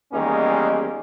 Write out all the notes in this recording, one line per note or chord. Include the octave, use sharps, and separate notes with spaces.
E2 D#3 G3 G#3 A#3 C#4